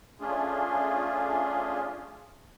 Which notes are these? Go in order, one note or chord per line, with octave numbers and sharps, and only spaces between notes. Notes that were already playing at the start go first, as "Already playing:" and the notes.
A3 C#4 D4 F4 G#4